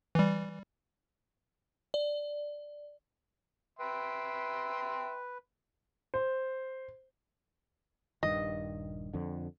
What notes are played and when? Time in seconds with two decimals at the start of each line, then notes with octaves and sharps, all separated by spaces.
0.15 E3 G3
1.94 D5
3.79 B4 E5 G5 C6
6.14 C5
8.23 D#1 G2 D#3 D#5
9.14 F2 D3